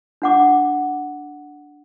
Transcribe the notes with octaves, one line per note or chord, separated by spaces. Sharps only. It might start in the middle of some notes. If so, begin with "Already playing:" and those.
D4 F#5 D6